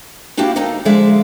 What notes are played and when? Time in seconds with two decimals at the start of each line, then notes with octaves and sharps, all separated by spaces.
0.37 A#3 D4 E4 F#4 G4 F5
0.56 D#3 D#4 A4 A#5
0.85 D3 F3 G#3 D5 E5 F5